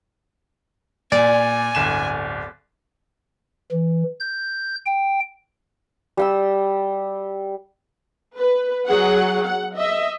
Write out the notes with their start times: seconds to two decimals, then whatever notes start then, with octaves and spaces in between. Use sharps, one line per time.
1.12 A#2 D5 G#5
1.75 D1 G1 E7
3.71 E3
4.20 G6
4.85 G5
6.17 G3 G5 E6
8.38 B4
8.88 F#3 G#4 F#5
9.44 F#5
9.76 D#5 E5